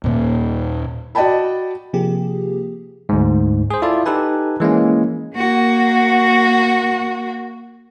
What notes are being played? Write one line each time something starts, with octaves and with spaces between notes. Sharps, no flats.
D#2 A#2 A#3
F#4 D5 D#5 G5 A5 B5
C3 F3 A#3 G4 G#4
D2 G#2
G#4 C5
E4 F4 A4 D5
D#4 G4 A4 B4 G#5
E3 G#3 A#3 C#4
A#3 F#4